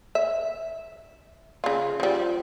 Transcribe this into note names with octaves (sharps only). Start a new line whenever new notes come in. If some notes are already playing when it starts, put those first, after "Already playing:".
E5
C#3 F4
F3 G3